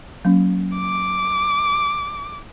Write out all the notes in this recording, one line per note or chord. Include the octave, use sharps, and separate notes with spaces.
F#3 A#3 C#4
D6